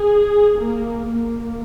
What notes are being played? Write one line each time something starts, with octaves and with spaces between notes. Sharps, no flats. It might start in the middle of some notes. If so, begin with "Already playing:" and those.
Already playing: G#4
A#3
A#3